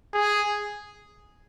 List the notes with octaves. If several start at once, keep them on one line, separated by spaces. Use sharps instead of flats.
G#4